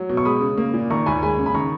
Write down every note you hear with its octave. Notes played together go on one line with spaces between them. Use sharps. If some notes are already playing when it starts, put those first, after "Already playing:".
Already playing: F#3
B2
C#6
G#3 B5 D#6
C#3
A#3
A#2
D#3 A#5 C#6
D#2 G#5 B5
G#3 G#5 B5
C#3
B5
D#3 A#5 C#6